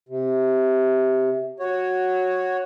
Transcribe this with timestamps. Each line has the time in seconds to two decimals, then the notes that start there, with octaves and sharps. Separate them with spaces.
0.09 C3
1.60 F#4 C#5